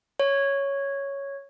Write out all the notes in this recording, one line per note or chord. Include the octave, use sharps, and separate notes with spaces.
C#5